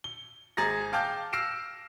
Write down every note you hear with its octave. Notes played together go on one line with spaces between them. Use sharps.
G7
G#1 G#4 A#5 A6 A#6
F5 G5 A5 D6 F6 G6
E6 F6 A#6 C7 D7 E7